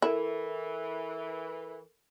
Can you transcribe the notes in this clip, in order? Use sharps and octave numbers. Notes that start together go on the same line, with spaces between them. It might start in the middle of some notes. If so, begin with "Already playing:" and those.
E3 E4 A4 A#4